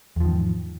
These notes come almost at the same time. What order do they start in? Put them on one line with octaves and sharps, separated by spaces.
E2 F3 D#3 G#2